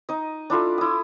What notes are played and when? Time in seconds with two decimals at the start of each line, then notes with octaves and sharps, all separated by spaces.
0.09 D#4 D#5
0.50 D4 E4 F4 A4
0.78 E4 D#6